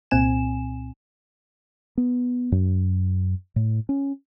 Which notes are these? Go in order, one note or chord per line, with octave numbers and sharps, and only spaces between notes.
C2 A#2 C4 G#5 E7
B3
F#2
A2
C#4